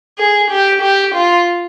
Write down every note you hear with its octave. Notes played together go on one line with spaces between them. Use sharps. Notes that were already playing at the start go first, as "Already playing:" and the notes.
G#4
G4
G4
F4